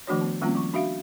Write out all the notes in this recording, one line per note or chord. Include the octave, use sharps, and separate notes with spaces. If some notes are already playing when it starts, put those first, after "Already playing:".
D#3 F3 A3 D4 F#4 C#5
B3
D#3 G3 A#3 C4 C#4 F4
F3 C#6
D4 F#4 E5 F5